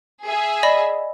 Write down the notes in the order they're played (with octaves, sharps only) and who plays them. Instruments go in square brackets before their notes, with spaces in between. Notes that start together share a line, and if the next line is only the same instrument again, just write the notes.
[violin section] G#4 E5
[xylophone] D5 D#5 B5